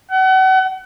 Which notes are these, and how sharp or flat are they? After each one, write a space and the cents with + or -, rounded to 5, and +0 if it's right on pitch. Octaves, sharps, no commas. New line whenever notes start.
F#5 +35